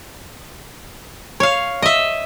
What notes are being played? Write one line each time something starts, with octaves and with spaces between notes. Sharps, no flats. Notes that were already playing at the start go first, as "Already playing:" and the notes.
C#5 F5
D#5 E5